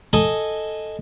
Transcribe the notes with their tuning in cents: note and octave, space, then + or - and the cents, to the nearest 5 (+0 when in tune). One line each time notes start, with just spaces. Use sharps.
A4 +0 D#5 +0 G#5 +0